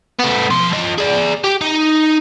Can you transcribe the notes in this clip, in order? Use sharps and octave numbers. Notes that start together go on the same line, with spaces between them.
A3 B3
F3 C6
F3 D#5
G#4 D5
G4
D#4